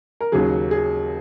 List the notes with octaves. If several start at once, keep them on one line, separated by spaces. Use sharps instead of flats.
A#4
D#2 C#3 F#3 G#4
G#4